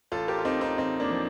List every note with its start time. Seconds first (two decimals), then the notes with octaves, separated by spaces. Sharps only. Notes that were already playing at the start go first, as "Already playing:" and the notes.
0.12 A1 F4 A4
0.28 G4 A#4
0.39 F4
0.45 A1 C4 D#4
0.61 C4 D#4
0.78 A1 C4 D#4
1.00 A#3 D4
1.11 F3